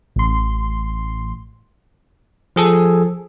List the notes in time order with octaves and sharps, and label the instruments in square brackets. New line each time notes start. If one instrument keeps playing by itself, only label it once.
[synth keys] A1 C6
[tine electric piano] F3 G#4 A4